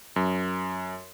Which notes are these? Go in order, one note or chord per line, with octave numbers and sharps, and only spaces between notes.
F#2